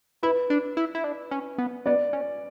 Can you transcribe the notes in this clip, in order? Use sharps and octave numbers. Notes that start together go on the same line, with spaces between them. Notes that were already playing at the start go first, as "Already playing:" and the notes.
E4 B4
D4
E4
E4
D4
C#4
B3
B3 D5
C#4